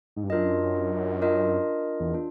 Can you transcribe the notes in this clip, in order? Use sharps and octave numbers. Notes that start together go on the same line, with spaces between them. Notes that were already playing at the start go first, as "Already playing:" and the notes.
G#2
G2
F#2 D4 F4 A#4 D#5
D4 F4 A#4 D#5
E2
D4 F4